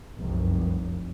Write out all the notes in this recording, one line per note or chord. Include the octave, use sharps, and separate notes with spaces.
F1 C2 F#2